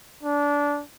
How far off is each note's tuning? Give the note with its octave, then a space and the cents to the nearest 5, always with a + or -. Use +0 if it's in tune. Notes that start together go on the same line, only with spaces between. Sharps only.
D4 -20